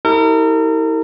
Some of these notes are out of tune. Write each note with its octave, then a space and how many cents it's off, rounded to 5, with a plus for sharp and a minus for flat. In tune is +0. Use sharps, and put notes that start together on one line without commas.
E4 -45 G4 -10 A#4 -40